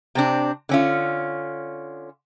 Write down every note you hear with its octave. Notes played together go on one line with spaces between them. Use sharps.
C3 C4 D4
D3 C#4 F4